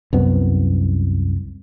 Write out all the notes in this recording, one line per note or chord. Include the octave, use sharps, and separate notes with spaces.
C2 F#2 B3